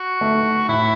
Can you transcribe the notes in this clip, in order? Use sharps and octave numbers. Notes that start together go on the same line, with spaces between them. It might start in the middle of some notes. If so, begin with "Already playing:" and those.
Already playing: F#4
A3
A2 E4